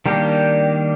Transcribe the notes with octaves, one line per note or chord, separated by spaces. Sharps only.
D#3 G3 A#3 D4 G4